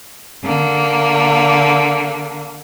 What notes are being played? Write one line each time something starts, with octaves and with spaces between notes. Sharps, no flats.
D3 A#3